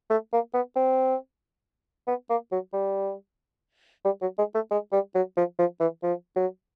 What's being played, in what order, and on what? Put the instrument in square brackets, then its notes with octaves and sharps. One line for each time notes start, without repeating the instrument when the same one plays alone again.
[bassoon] A3
A#3
B3
C4
B3
A#3
F#3
G3
G3
F#3
G#3
A3
G#3
G3
F#3
F3
F3
E3
F3
F#3